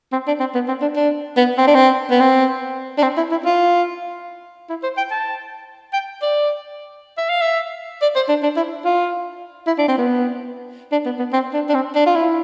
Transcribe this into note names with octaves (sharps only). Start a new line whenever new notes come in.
C4
D4
C4
B3
C4
D4
D4
B3
C4
D4
C4
B3
C4
D4
C4
E4
E4
F4
E4
C5
G5
A5
G5
D5
E5
F5
E5
D5
C5
D4
D4
E4
F4
E4
D4
C4
B3
D4
B3
B3
C4
D4
D4
C4
D4
F4
E4